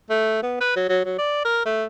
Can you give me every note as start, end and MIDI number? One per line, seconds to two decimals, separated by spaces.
0.10 0.41 57
0.43 0.58 59
0.61 0.74 71
0.76 0.86 54
0.89 1.01 54
1.05 1.15 54
1.18 1.42 74
1.45 1.61 70
1.65 1.85 57